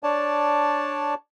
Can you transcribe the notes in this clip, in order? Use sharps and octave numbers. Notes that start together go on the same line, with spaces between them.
D4 C#5 D5 A5